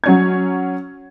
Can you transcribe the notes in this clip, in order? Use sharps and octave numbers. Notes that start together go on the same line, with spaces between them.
F#3 C#4 G#6